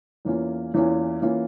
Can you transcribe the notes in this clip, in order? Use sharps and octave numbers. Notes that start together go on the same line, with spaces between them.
E2 E3 A#3 C#4 F4
E2 E3 A#3 C#4 F4
E3 A#3 C#4 F4